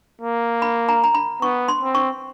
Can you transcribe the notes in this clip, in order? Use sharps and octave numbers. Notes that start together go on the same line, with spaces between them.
A#3
B5
A#5
A#5
B5
B3 C#6
C6
C4
C#6